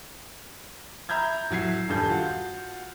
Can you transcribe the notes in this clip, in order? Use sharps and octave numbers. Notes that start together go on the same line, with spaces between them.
E5 A#5 B5 G6 G#6
A2 F#3 G#6 C7
D#1 G2 D4 A4 G6
F4 F#4